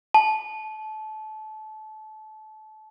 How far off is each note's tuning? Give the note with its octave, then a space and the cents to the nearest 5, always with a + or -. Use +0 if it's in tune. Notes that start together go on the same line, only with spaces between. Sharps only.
A5 -25